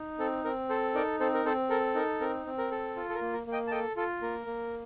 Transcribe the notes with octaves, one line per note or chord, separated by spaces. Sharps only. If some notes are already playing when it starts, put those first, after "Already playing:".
Already playing: D#4
C4 A4
C4 A#4
A4 C5
D#4 A#4 D5
C4 A4 C5
A#4
C4 A4 C5
A4 A#4
D#4 A#4
C4 A#4
C4
A#4
A4
F4
A4
A#4
A#3
A#4
A#3
D#5 G5
A5
A4 D#5 G5
F4 A4
A#3 A#4
A#3